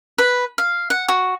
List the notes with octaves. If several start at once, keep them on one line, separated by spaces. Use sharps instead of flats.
B4
F5
F#5
F#4